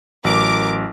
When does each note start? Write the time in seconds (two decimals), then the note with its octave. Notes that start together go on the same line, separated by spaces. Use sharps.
0.24 A1 F#3 A#4 D6